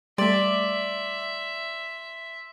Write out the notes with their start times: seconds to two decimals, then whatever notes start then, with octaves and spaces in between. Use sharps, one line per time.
0.18 G3 A3 D5 E5 C6 F#7